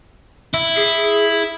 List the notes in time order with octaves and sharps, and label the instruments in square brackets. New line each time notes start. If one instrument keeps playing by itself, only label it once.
[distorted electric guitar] E4
[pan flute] G#4